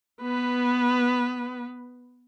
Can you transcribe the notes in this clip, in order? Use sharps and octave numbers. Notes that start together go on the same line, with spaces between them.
B3 B4